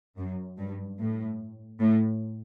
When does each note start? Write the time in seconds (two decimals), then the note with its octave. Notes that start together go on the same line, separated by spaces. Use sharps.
0.17 F#2
0.58 G2
0.99 A2
1.80 A2